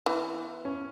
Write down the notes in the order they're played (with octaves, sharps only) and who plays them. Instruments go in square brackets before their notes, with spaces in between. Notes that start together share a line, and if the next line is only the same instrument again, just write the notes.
[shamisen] E3 [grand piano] B3
[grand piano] C#4